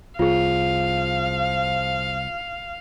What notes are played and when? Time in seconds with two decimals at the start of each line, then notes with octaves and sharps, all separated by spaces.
0.19 C2 F3 F4 G#4 F5